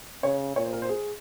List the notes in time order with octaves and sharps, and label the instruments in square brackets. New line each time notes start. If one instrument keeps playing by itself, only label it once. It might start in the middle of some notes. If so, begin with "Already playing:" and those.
[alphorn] C#3 [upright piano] C#5
[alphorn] A#2 [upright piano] C#5
[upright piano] C5
A#4
C5
G#4